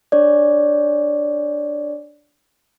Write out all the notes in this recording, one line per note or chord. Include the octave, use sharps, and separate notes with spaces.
D4 C#5 D5